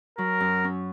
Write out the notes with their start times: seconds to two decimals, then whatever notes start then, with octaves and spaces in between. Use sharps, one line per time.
0.18 F#3 A#4
0.40 F#2
0.64 C#4